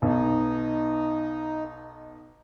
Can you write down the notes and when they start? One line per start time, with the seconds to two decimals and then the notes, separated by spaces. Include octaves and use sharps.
0.02 B1 B2 D#4